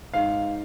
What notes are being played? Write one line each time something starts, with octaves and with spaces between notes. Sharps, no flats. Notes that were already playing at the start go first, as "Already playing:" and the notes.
G#2 F5